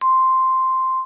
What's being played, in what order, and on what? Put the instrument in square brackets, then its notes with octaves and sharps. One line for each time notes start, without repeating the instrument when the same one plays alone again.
[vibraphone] C6